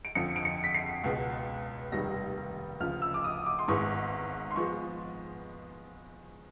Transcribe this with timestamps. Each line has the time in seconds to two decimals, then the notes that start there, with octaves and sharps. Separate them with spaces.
0.05 D7
0.15 F2 D3 F3 C#7
0.36 D7
0.45 C#7
0.64 B6
0.75 C7
1.04 C#2 B2 G#3 B3
1.92 F1 D#2 D#3 G3 A#6
2.80 D2 C#3 F3 F6
3.02 E6
3.14 D6
3.24 D#6
3.46 D6
3.59 C6
3.68 G#1 G#2 E3 G#3 B3 C#6
4.51 C6
4.56 F3 G#3 B3 C#6